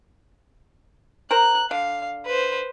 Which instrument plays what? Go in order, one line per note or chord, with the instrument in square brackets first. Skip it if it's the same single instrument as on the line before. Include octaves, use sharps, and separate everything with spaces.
[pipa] A#4 C5 A#5 [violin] F#6
[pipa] D3 [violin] F5
[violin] B4 C5